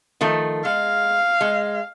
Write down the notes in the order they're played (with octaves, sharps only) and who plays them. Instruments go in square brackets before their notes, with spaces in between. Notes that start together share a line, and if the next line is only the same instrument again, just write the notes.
[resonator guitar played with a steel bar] D#3 F3 A3
[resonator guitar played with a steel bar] G#3 [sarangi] F5
[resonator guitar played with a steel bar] G#3